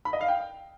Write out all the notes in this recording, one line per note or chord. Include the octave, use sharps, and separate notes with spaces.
B5
D#5
F5
G5